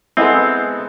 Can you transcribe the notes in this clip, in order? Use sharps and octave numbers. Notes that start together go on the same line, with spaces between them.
G#3 B3 C4 E4 G#4 A4 D#5